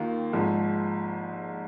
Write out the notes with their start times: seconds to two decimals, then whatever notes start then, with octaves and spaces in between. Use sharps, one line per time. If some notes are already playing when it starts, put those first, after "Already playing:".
Already playing: D#2 D#3 A#3 F4
0.33 G#1 G#2 F3